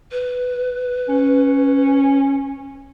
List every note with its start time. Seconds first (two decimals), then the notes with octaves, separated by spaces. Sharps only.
0.11 B4
1.09 C#4